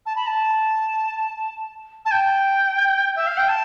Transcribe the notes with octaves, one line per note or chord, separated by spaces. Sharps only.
A5
B5
A5
A5
G5
E5
F5
G5
A5